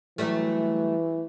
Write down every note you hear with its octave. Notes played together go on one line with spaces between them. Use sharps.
E3 F#3 G3 A3